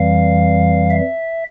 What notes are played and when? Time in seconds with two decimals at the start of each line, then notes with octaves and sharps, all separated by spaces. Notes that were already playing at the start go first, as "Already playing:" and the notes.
Already playing: F2 E3 G3 F5
0.90 E5